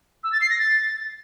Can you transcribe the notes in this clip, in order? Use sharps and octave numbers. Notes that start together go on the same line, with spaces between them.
E6
A6
C7
A#6
A6